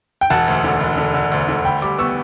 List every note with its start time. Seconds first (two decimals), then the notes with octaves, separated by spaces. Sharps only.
0.21 G5
0.30 E1 F#5 A5
0.48 D2
0.64 D3
0.80 E1
0.97 D3
1.14 D3
1.32 D2
1.49 D3
1.65 D2 G5 B5
1.82 G3 B5 D6
1.98 B3 C#6 E6